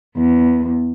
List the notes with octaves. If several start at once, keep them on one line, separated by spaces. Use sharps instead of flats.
E2